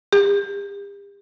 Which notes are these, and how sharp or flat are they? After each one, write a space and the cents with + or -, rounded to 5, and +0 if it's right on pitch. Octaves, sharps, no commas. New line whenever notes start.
G4 +40